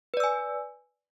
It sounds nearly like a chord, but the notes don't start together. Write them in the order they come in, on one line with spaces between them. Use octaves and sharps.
B4 D5 E6 G#5